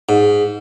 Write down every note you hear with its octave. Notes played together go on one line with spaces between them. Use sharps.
G#2